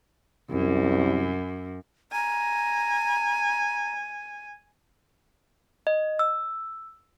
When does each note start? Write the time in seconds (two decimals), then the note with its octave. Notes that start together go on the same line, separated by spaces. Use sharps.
0.51 C2 F#2
2.12 G#5 A#5
5.87 D#5
6.19 E6